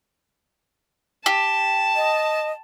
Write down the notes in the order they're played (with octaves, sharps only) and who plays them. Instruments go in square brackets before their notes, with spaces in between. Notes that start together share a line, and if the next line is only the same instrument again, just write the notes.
[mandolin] G4 [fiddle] A5
[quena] D#5